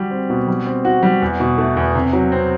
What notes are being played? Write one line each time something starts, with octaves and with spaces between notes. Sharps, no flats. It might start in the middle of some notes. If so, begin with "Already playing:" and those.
Already playing: G3 F#4
C4
B2
G3
C4
F#4
G3
E2
B2
A3
E2
C3
F#3
C4